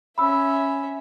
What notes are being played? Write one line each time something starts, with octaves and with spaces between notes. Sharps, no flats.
C#4 E5 B5 E6